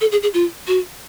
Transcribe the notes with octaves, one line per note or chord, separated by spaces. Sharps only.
A4
G#4
G#4
F4
F#4